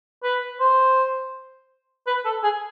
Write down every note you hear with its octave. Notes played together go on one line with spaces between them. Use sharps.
B4
C5
B4
A4
G#4